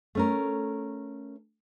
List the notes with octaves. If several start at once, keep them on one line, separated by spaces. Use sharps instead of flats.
A3 C#4 A#4